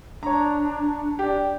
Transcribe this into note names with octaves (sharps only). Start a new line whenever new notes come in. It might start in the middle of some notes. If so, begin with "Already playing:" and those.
D4 C#5 A#5
D4 G4